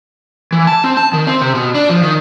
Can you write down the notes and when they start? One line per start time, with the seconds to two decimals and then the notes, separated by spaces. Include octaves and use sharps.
0.52 E3
0.67 A5
0.84 C4
0.97 A5
1.13 D#3
1.27 C4
1.42 C3
1.55 B2
1.75 D4
1.89 F3
2.03 D#3